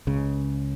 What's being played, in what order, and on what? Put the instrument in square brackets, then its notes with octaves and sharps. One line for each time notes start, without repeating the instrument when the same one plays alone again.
[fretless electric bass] C#2 C#3